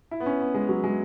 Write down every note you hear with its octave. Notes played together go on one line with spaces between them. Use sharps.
E4
B3
C#4
B3
G#3
F#3
G#3